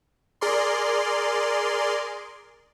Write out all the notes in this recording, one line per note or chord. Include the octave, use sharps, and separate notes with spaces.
G#4 A#4 D5 C6